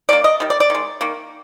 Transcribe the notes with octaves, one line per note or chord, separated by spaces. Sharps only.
D#3 A#3 D5
D#5
D#3 G3
D5
D5
D#3 G#3
D#3 A#3